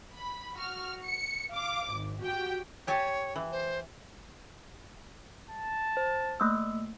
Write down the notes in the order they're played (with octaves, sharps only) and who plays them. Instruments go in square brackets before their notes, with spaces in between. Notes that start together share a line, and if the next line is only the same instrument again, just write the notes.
[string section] B5
F#4 F6
C#7
F5 D6
G#1
F#4 G4 G5
[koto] G4 G#5 A5 [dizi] C#5
[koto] E3
[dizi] C5
[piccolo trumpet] A5
[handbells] C5
A3 A#3 E6